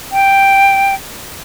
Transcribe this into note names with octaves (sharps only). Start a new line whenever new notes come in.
G5